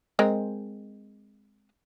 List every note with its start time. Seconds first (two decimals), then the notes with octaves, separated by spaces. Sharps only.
0.19 G#3 C4 A#4